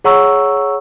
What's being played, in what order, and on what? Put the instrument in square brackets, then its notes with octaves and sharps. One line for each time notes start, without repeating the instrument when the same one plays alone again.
[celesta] G#4 C#5 F#5 A#5 C#6 E6